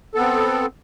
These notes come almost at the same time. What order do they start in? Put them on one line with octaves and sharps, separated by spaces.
A4 B3 C4